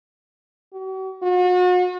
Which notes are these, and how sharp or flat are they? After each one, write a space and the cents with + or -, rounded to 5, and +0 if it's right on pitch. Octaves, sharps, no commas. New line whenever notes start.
F#4 +45
F#4 -40